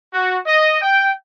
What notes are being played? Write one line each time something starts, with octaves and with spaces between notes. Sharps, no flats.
F#4
D#5
G5